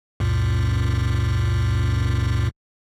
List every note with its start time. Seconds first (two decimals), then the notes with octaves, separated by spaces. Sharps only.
0.20 C#2 F#2 A#2